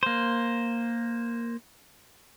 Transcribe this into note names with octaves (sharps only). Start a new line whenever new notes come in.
A#3 C5